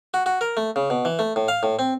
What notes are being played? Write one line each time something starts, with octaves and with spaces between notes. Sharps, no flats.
F#4
F#4
A#4
A3
C#3
B2
E3
A3
A2
F5
A2
C4